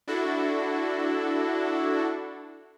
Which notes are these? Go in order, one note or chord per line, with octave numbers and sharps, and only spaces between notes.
D4 E4 F#4 A4